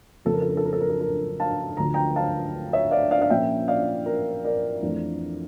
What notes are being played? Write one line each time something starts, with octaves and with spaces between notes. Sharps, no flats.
F2 C#3 F3 A4
A#4
A4
A#4
A4
A#4
A4
A#4
A4
A#4
F5 A5
D2 D3 F3 A#5
G5 A#5
F5 A5
C#5 E5
D5 F5
D5 F5
F5
A#2 F3 A#3 C#4 E5 G5
D5 F5
A#4
A#4 D5
F2 E3 A3 D4